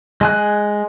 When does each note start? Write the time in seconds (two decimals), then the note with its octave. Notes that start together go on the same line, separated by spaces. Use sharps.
0.21 G#3 G#5 F#6